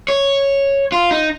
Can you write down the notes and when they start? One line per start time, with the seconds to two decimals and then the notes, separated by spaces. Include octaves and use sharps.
0.08 C#5
0.92 F4
1.11 D#4